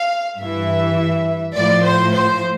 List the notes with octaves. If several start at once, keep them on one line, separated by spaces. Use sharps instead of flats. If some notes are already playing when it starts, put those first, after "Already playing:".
Already playing: F5
G2 E3 E5
A2 F3 D5
C5
C5